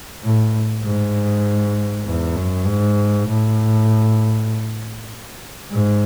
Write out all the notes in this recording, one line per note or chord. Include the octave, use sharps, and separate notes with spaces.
A2
G#2
E2
F#2
G#2
A2
G#2